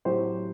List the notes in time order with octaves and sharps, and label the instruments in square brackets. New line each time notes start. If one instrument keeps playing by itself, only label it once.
[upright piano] A2 F#3 C4 G4 C5